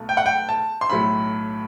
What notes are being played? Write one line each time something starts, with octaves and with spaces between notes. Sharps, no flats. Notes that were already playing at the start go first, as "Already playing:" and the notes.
Already playing: B1 B2 A3
G5
F#5
G5
A5
C6
B1 A2 F#3 A3 B5